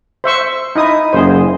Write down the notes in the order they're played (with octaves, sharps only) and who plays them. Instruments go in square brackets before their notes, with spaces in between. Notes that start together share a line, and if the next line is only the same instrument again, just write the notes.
[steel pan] C5 E5 C#6
D#4 E4 D#6
[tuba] F#1 [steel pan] G#4 C5